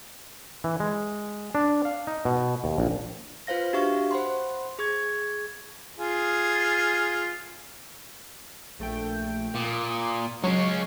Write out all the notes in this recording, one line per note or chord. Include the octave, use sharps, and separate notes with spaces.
E3
G#3
D4
F5
D#4
B2
D#2
A#1
F4 B4 C5 F5 A#6
D4 F#4 G4 E5 F5 C#6
C5 F#5 B5 C6
G#4 C#6 G#6
F4 G#4
A#1 A3 G5
A#2 D6 D#6
F#3 G#3 C#4 C#6